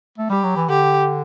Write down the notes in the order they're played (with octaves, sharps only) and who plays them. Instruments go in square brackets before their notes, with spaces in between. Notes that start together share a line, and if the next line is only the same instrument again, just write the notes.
[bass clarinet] A3
[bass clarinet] G3 [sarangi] G4
[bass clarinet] F#3
E3
[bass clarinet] D3 [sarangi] G4